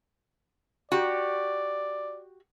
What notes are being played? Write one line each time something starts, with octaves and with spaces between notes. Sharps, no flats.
F#4 G4 D5